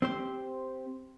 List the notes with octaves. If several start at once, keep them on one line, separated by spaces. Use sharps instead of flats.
C4 G4 C5